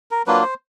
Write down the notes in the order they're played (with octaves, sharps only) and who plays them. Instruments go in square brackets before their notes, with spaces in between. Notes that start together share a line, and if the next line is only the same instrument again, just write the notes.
[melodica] A#4
F#3 A#3 D4 F4 B4
C5